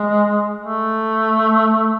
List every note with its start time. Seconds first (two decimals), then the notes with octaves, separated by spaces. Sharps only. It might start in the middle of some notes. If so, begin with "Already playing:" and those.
Already playing: G#3
0.62 A3